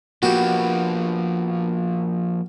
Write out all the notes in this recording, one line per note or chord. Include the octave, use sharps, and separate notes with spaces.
F3 A#3 B3 F#4 G4